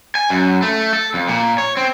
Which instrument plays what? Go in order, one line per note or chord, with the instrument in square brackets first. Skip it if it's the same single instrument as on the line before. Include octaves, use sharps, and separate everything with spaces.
[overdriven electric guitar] G#5
F#2
A3
A4
F2
A#2
C#5
C4